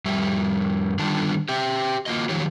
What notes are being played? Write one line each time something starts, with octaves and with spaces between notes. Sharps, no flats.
F2 G3 E5
D3 D#3 G3 D4 F4 A5
G4 E5 G5
A#3 F4 F#4 D#5
D#3 F3 F#3 G4 C#5